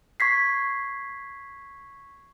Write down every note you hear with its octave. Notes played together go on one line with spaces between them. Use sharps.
C#6 G#6 B6 C7